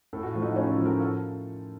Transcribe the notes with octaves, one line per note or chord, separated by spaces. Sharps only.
A2 A4
F#4
F3 A3 F4
D#4 F#4
F#4
A2 C#4 F4
F4 A4
F3 A3
F#4 A#4
F4 A4